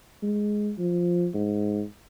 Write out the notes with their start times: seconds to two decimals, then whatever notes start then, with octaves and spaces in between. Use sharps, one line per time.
0.23 G#3
0.78 F3
1.34 G#2